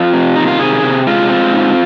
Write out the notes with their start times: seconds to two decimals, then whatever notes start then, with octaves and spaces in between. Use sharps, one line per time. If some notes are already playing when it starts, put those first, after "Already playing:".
Already playing: F2 F4
0.14 C3
0.36 D#3 D#4
0.48 F4
0.59 C3 G#4
0.83 C3
1.07 G#3 F4
1.29 C4
1.53 G#2